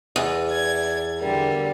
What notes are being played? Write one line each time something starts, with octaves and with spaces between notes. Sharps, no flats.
E2
D5 G#6
D3 G3 A#4